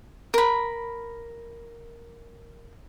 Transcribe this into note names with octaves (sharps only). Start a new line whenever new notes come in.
A#4 B5